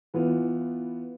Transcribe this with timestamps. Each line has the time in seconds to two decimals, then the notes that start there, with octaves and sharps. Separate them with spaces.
0.14 E3 B3 F4